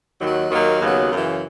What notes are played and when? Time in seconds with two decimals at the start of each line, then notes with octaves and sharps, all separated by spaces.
0.19 D#2 D#3 F#3
0.50 D#2 D#3 F#3 A#3
0.81 D#2 C#3 F#3 B3
1.11 F#2 C#3 E3